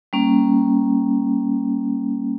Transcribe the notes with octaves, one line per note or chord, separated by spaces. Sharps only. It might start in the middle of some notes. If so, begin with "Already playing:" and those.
G3 A#3 C#4